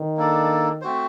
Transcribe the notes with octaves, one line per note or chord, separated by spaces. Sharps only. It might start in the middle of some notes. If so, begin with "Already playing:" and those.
Already playing: D#3
A#3 D4 A4 D5
A3 C4 F#4 C5